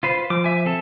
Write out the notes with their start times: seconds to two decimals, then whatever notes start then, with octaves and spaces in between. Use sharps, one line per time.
0.03 F4 B4 C5
0.30 F3 D6
0.44 E5 G#5
0.66 C4 A4 A5